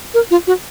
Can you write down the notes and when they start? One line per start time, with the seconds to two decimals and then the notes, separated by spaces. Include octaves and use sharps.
0.14 A#4
0.31 F4
0.47 F#4